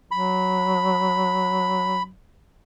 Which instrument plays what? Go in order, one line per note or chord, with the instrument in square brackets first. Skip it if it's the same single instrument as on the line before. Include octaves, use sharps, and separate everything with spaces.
[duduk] F#3 [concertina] B5